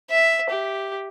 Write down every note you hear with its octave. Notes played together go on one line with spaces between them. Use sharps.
E5
G4